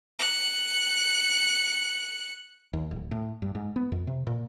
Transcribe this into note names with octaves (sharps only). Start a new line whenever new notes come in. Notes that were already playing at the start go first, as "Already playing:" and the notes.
F#6 C#7
D#2
D1
A2
G2
G#2
B3
F2
C3
A#2